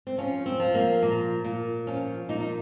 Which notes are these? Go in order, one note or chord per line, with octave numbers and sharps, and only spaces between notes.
C4
F3 C#4
C4
F3
A#3
A#2
A#2
F3 C#4
A#2 D#4
D#4